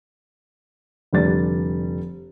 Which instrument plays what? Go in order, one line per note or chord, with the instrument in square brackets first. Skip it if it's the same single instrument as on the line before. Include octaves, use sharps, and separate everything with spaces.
[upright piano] F1 D3 G3 D5 A6